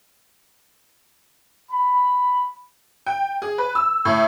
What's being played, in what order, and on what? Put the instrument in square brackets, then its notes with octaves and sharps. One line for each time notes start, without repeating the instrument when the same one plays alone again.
[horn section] B5
[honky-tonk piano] G5
G#4
B4
E6
A2